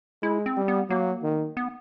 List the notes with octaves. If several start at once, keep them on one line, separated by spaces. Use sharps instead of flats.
G#3 E4
C4
G3
B3
F#3 A#3
D#3
B3